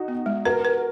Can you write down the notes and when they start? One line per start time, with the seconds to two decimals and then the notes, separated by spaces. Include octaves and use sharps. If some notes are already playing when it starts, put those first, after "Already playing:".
Already playing: D#4 F#4
0.08 B3
0.26 G#3
0.45 F#4 A#4 B4
0.65 B4